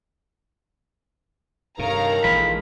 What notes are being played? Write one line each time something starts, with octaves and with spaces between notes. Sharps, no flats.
G2 C3 D#3 A4 A#4 C#5 F5 A#5
A#1 E3 G#3 F4 B5